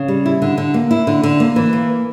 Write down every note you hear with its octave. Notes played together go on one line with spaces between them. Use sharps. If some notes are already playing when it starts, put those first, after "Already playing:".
Already playing: C#3
G3
E4
D3
D3
A#3
E4
D3
D3
A#3
E3
A#3